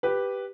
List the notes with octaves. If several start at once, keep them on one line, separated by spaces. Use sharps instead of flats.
G4 B4